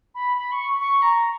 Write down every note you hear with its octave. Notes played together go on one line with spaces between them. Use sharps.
B5
B5
C#6
C#6
A#5